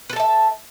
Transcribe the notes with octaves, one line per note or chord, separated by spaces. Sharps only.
A4 B4 E5 A5